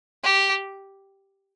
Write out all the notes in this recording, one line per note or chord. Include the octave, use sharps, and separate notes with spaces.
G4